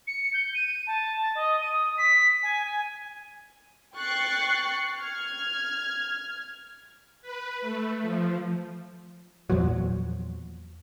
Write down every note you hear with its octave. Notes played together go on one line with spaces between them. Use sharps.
C#7
G6
D#7
A5
A6
D#5
D#7
D#6
B6
G#5
G#5
G5 C#6 F#6 A6 C7 C#7
F6 G#6
B4
A3
F3
E2 A#2 F3 F#3